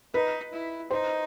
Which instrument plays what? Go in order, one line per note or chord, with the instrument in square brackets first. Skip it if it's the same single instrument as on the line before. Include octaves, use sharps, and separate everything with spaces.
[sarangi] D#4 [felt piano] B4
[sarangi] E4
[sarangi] D#4 [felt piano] C5